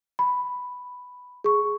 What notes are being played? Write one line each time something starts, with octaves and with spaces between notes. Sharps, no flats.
B5
G#4 C#6